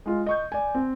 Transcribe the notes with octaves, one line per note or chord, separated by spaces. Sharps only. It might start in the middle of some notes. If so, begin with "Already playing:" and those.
G#3 F4
D#5 C#6 G6
D5 G#5
C4